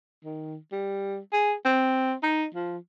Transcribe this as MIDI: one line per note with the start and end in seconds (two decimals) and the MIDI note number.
0.25 0.57 51
0.72 1.18 55
1.33 1.53 68
1.65 2.13 60
2.23 2.45 63
2.55 2.77 53